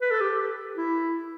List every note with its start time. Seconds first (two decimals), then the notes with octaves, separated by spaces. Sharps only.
0.01 B4
0.11 A4
0.21 G4
0.77 E4